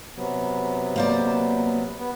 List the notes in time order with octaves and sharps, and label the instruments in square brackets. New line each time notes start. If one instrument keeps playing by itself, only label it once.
[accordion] C3 F#3 B3
[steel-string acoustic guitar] A#3 C5 D5
[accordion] B3